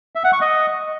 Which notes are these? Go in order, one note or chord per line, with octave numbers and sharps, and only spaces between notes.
E5
F#5
C#6
D#5